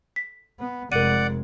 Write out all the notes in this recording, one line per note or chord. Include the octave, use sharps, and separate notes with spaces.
B6
B3
F1 G#3 A#4 D5 F#5 D#7